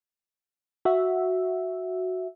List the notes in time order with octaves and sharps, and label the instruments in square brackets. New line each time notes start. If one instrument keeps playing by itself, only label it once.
[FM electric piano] F#4 E5